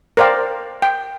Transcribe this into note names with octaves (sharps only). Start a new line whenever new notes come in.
A#4 C5 D5 F5 G5
G5